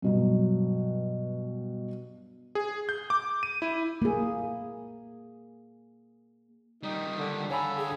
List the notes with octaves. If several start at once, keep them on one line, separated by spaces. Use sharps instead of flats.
G2 B2 F#3
G#4
G6
D6
D#7
E4
A#3 G#4
D#3 G3 D#4
D3
D3 A4 C#5 F5 G#5 A#5 B5
G#4